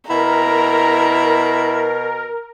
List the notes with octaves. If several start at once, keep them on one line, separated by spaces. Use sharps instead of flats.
B2 E4 A#4 A#5